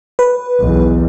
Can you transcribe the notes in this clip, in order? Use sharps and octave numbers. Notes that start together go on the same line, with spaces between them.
B4
B1 E2